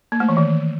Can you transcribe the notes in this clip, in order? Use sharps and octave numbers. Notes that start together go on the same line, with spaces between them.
A#3
A3
E3
D#3